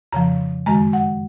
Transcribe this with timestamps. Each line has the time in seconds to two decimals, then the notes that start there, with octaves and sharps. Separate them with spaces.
0.12 F2 C#3 F3 A#5
0.66 F#2 D#3 G#3 A#5
0.93 F#5